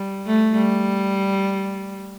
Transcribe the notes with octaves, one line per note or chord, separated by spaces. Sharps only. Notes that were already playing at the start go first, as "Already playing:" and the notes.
Already playing: G3
A3
G3